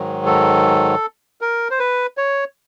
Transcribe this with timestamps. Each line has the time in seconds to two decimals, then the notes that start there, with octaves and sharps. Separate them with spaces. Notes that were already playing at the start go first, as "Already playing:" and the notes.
Already playing: G#2 D#3 F#3
0.26 A4
1.41 A#4
1.71 C5
1.80 B4
2.17 C#5